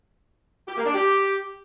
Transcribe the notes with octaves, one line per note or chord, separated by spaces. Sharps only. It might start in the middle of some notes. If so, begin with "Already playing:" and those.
G4
A#3
D4
G4